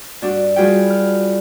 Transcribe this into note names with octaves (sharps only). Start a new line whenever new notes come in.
G2 D4 F#4
G3 F4 F#4 G#4 B4 G5
F6